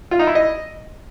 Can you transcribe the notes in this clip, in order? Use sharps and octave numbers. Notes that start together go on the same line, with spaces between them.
F4
D#4
E4
D#5